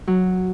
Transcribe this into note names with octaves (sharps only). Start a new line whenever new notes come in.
F#3